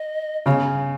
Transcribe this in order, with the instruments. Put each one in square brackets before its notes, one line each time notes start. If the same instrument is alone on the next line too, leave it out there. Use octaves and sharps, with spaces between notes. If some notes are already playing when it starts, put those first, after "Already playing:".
Already playing: [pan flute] D#5
[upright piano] C#3 [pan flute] C#5